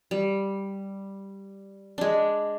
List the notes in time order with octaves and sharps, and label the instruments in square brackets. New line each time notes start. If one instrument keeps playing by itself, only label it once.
[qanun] G3
G#3 D4